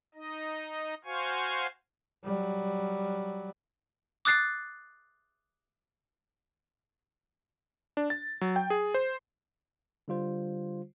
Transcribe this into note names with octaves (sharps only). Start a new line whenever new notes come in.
D#4 D#5
F#4 C5 F5 G#5 C#6
F#3 G3
D6 D#6 F#6 A6 C7
D4
A6
F#3
G5
G#4
C5
D3 G3 F4 C5